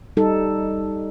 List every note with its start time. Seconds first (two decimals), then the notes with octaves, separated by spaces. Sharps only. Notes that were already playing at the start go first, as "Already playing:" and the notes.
0.17 G3 D#4 A4